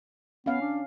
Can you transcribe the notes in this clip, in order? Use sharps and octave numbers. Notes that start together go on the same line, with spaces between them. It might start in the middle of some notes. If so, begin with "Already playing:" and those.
B3 C#4 F5
D4